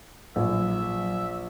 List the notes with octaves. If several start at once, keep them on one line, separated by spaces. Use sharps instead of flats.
A#1 F#3 E5